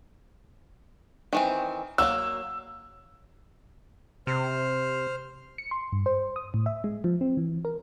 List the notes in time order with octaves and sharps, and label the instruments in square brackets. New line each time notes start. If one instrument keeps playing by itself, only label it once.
[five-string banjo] D#3 E3 C4
[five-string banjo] F#3 G3 A#3 [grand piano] E6
[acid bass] C3 [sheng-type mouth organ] C5 F6
[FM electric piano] C#7
C6
G2
C5
D#6
A2
E5
G#3
F3
C4
E3
A#4